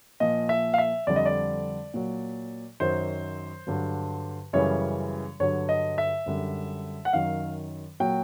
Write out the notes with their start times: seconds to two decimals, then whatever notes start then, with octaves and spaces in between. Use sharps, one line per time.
0.20 A#2 F3 D#5
0.49 E5
0.74 F5
0.78 E5
1.07 F2 D3 G3 D5
1.16 D#5
1.25 D5
1.94 A#2 F#3
2.80 F#2 D#3 F#3 C5
3.67 G2 D3 F#3
4.53 F#2 C#3 E3 G3 C#5
5.40 G2 D3 F#3 C#5
5.69 D#5
5.98 E5
6.26 F#2 D3 G3
7.05 F#5
7.13 F#2 D#3 F#3 F5
8.00 A#2 F#3 G5